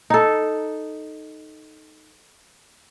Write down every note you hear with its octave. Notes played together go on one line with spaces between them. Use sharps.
D#4 A4